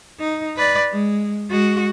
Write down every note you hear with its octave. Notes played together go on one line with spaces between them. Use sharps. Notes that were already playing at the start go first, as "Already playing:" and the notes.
D#4
B4 D5
G#3
G#3 F#4